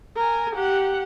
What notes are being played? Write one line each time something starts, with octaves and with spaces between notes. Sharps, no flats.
A#4 G#5
G4 F#5